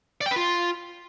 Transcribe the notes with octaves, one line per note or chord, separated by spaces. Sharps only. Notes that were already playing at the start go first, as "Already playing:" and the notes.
D5
G5
B4
F4